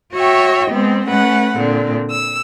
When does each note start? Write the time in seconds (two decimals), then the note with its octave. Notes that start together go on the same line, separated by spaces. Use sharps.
0.14 F#4 C#5 E5 G5
0.72 G#3 B3 C4
1.08 A3 C#4 B4 F#5
1.57 A#2 D3 C4
2.11 E6